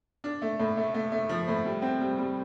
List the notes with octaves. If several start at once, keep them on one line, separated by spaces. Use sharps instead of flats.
D4
A3
A2
A3
A3
A3
F3
A2
G3
C4
G3
G3